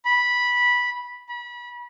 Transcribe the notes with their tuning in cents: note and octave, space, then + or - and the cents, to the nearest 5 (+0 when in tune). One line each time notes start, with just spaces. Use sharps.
B5 -10
B5 -30